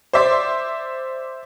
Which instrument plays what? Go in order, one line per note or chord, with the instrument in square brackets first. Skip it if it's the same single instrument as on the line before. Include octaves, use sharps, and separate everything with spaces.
[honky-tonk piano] C5 D5 E5 C6 D6